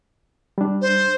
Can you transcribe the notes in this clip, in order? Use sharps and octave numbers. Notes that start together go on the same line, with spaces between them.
G3 D4
C5